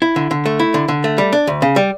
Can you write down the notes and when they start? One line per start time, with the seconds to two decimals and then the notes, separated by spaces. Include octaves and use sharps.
0.02 E4
0.16 D3
0.31 D3
0.46 A3
0.60 E4
0.74 D3
0.88 D3
1.04 A3
1.18 G3
1.33 D4
1.47 D2
1.62 C#3
1.76 G3